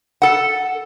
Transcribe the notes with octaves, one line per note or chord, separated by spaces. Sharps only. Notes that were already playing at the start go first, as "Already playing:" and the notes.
A4 F#5